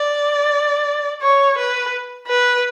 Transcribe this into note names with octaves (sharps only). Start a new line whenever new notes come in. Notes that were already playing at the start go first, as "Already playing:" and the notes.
Already playing: D5
C#5
B4
B4